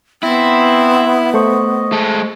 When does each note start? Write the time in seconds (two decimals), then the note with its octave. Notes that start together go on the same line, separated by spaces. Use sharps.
0.23 B3 C4 E4
1.34 A3 C5 D#5 C#6
1.92 G#3 A4